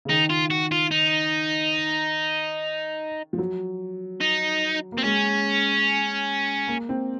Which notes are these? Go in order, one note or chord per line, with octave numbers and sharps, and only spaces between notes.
C#3
D#3 D#4
F4
F#4
F4
D#4
F3
F#3
D#4
A#3
C4
G#3 C#4
A#3
C4